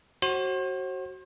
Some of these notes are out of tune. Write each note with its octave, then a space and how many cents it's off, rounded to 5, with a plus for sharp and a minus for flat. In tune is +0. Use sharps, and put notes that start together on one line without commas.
F#4 +20 C5 +40